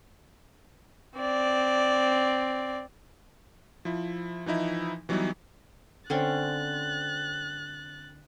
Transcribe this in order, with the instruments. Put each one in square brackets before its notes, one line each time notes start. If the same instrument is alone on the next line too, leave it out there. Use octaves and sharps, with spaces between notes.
[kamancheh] C4 D5
[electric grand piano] F3 E4
E3 F3 D#4 E4
E3 F#3 G3 B3 D#4 E4
[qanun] D3 C4 C#4 [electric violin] F#6 A6